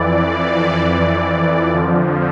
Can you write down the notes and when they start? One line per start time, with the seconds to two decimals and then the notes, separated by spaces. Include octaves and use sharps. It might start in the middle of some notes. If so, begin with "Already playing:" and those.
Already playing: F2 E3 D5
1.72 F2 D3 F3